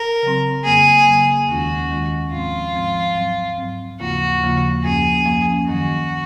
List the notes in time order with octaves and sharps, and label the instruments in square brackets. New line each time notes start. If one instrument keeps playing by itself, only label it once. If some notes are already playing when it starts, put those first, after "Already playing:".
Already playing: [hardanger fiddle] A#4
[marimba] C#3 F#3 C4
[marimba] F2 C#3 F#3 A#3 [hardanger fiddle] G#4
[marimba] F2 C#3 F#3 A#3
[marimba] D#2 D#3 G#3 C#4 F4 [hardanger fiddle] F#4
[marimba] D#2 D#3 G#3 C#4 F4
[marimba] G#2 F3 G#3 C4 [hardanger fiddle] F4
[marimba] G#2 F3 G#3 C4
G#2 F#3 C4
G#2 F#3 C4
[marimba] D#2 C#3 F3 A#3 F4 [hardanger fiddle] F#4
[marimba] D#2 C#3 F3 A#3 F4
[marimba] F#2 F3 A#3 C#4 [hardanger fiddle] G#4
[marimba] F#2 F3 A#3 C#4
[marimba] F#2 D#3 F#3 [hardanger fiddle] F#4